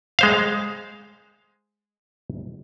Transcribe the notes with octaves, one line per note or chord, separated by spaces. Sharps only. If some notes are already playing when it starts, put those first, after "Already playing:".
G#3 C5 F5